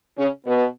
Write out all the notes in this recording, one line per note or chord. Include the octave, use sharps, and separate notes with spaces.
C#3 C#4
B2 B3